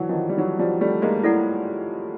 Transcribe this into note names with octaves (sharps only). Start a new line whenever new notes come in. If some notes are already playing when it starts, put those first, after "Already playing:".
Already playing: D3 E3 F#3
D#3 F3
G3
E3 F#3
F3 G3
G3 A3
G#3 A#3
E4 A4 D5 F#5